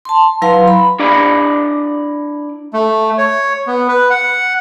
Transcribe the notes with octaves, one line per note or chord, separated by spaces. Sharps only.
A5 C6
F#3 E4 B4 F5 A#5 C6
B5
D4 E4 D5 A#5 B5
A3
C#5
B3
B4
F#5